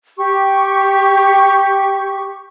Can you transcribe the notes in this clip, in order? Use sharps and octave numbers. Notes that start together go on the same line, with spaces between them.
G4 C#6